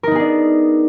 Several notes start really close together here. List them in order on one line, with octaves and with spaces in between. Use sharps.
A#4 D#4 B3 G#4 D4